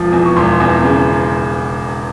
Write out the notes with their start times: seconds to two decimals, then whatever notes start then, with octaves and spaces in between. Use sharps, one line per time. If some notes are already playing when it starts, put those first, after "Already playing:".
Already playing: E1 F3
0.12 E2
0.25 C#6
0.36 E1 C6
0.60 E2
0.84 C#3